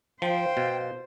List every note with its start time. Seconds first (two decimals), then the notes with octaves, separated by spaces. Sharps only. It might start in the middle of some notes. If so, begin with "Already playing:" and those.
0.22 F3 C5 F5 G5
0.57 B2